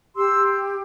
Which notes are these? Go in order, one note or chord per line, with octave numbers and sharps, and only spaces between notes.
G4 C6 E6